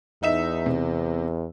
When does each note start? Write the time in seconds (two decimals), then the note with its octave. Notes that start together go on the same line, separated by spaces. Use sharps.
0.23 E2 D#4 E5 E7
0.66 C3